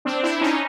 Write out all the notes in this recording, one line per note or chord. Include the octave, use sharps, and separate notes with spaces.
C4 D4
D4 E4
C#4 D#4